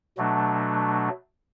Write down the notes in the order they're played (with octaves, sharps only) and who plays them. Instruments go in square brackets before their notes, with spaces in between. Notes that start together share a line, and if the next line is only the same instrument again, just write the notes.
[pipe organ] B2 F#3 A3 D4